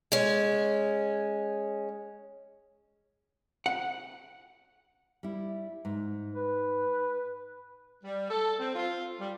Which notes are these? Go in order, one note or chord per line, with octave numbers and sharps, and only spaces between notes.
G#3 C#4
F#5
G3 E4
G#2
B4
G3
A4
C4
F4
G3